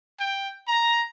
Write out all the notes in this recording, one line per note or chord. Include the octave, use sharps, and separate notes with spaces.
G5
A#5